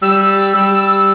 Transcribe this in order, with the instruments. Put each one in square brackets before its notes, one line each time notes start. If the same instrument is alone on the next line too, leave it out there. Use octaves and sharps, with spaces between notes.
[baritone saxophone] G3 [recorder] E6
[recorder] E6
E6
[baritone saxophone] G3 [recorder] E6
[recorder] E6
E6